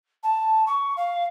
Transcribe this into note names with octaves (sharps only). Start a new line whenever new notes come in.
A5
C#6
F5